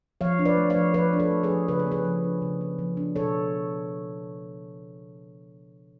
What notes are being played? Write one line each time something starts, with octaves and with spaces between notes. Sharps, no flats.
F3 C#5 F5
D4
B4 D5
A3
C#5 F5
F3
F3 B4 D5
D4
A4 C#5
A3
G#4 B4
F3
C#3 B4
C#5
B3 G#4 B4
F3
D4
C#3
B3
F3
D4
B2 A4 C#5